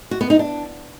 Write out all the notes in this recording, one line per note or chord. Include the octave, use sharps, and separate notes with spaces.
F#4
B3
D#4
D4